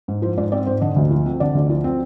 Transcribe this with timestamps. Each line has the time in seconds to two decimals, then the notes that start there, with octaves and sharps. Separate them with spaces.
0.08 G#2
0.22 F3 C5
0.37 G#2 D5
0.52 C4 D5
0.66 G#2 C5
0.81 D3 D#5
0.96 D2
1.11 F3
1.26 C4
1.40 D3 D5
1.55 D2
1.70 F3
1.84 C4